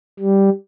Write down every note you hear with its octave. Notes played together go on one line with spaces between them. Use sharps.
G3